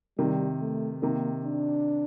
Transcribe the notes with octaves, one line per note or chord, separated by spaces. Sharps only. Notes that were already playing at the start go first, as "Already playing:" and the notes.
C3 D#3 G3
A3
C3 D#3 A#3
D4